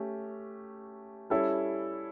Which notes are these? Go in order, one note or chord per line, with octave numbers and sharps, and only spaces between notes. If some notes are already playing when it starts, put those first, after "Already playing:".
Already playing: A3 C#4 G4
G3 C#4 E4 A4 C#5